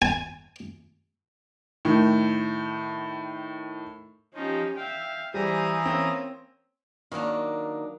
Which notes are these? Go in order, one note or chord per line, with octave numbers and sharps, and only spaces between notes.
G#5
A2 D#3
F3 C#4 D#4 G4
E5 F5 G5
E3 G3 C5 G#5 A#5 D#6
A#3 C4 C#4
D#3 F#3 A#3 D4